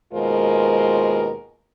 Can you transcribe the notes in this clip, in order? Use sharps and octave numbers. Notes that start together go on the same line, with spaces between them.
D#2 B2 G#3 F4 A#4 C5